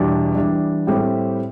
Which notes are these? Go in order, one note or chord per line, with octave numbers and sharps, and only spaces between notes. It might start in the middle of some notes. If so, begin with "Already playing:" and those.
Already playing: E2 B2 G3 D4 G4
E3 G3 D4
A2 G3 C4 G4